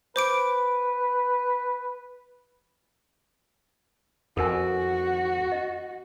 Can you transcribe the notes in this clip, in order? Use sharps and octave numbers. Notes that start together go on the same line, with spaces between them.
B4 C5 D6 D7
F2 F#4 A4 A#4 G#5
D#5